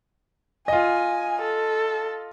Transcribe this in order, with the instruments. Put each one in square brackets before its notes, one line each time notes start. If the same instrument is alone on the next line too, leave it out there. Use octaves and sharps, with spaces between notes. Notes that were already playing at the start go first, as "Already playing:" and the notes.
[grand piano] F4 D#5 [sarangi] G#5
[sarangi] A4